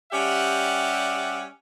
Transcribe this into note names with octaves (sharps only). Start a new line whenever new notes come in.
G3 C#4 G4 D5 E5 F#5